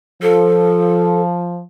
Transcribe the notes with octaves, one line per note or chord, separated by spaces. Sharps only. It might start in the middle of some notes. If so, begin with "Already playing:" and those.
F3 A4